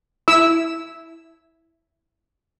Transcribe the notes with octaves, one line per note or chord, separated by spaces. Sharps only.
E4 E6